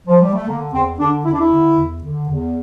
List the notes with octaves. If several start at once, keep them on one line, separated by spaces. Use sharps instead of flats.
F3
G3
A3
D3 A#3
E2 C4
D3 D4
E2 E4
D4
E4
D3
E2
D3
E2